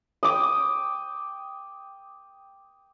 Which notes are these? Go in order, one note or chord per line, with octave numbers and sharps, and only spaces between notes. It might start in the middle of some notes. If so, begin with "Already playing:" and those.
G5 D6 D#6